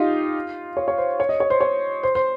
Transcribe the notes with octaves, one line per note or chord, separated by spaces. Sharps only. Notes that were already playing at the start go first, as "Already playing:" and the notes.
Already playing: D#4 F4 G4
C#5
C#5
C5
C#5
D#5
C#5
C5
C#5
C5
C5